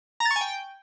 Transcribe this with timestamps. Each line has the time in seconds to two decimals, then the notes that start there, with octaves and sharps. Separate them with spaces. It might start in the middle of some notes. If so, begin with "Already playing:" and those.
0.20 A#5
0.25 A6
0.31 C#6
0.36 G#5
0.41 G5